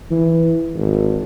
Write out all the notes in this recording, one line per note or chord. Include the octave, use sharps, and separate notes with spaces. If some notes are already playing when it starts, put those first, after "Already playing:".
E3
G#1